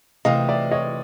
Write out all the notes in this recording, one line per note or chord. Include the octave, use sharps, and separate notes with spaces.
C3 E3 A3 D#5 F5
D5 E5
C#5 D#5